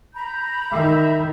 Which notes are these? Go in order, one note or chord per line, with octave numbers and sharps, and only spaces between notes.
A#5 B5 G6
D#3 E5